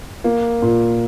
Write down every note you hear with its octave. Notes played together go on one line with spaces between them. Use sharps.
A#3
A#2